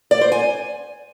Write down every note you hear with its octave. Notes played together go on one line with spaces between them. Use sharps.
D5
C5
G#5